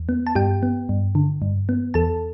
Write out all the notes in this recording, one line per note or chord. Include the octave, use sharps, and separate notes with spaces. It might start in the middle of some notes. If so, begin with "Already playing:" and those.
Already playing: E2
B3
A5
G2 G4 G5
B3
G2
D3
G2
B3
E2 A4 A5